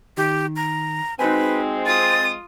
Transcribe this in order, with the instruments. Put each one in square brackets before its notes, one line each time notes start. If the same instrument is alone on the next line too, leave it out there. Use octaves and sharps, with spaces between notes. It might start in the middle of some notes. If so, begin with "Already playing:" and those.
[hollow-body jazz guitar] D#3 [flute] G4
[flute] A#5
[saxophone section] G#3 C4 [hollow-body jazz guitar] D#4 F#4 G#5 [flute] B4
[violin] F4 D#6 [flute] A6